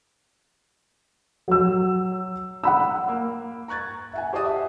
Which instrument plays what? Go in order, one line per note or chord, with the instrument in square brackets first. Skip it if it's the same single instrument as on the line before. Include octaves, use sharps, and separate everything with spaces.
[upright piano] F#3 E6
[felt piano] F#5 B5 E6
A#3
A#5 C#6 F#6 G#6 A6
E5 F#5 G#5
G4 C5 D5 D#5 A5 D#6
E5